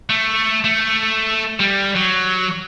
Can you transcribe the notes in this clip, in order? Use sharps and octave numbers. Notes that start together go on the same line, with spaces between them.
A3
A3
G3
F#3